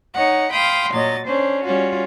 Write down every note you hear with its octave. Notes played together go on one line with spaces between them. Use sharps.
D#4 C#5 D#5 F#5
F5 G5 B5 C6 D#6
A#2 F#3 D#5 A6
C#4 D4 C5
G3 C#4 F4 F#4